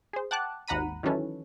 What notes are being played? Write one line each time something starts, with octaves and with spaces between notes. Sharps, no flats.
G#4 C5
F#5 G5 A5 D6 F#6
G#1 D#2 F#5 A#5 B5 D#7
D#3 E3 F#3 C#4 A4 B4